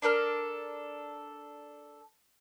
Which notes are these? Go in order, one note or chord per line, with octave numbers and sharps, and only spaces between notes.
D4 A4 A#4 F6